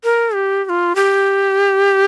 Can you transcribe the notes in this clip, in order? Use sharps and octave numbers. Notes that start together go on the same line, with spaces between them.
A#4
G4
G4
F4
G4